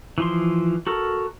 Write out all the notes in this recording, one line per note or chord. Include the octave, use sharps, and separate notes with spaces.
E3 F3 C6
F#4 A4 A#4